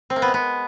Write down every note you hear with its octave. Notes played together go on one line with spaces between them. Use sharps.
C4
A#3
B3
G#3
B3